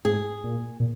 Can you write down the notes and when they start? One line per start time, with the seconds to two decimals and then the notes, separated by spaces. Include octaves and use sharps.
0.05 G#2 G#4
0.44 A#2
0.80 A#2